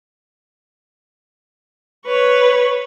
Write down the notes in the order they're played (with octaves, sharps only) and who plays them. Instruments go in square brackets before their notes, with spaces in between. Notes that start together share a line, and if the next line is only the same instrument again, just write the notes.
[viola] B4 C#5